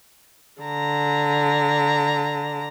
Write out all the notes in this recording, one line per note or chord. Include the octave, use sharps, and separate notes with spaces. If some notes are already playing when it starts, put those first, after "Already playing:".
D3 A#5